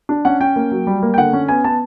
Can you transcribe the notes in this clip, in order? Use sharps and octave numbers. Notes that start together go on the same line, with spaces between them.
D4
C#4 F#5
C#4 G5
A#3
F#3
G3
A#3
G5
D3 F#5
C#4
B3 G#5
B3 A5